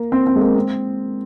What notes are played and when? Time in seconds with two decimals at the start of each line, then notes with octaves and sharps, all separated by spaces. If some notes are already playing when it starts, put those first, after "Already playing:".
Already playing: A#3
0.12 C4
0.27 C4
0.36 G#3
0.41 A#3
0.55 C4